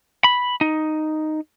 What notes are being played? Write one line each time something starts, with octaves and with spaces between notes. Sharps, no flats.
B5
D#4